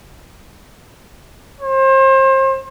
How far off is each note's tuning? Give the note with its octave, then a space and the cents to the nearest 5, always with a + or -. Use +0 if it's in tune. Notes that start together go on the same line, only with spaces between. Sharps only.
C5 +35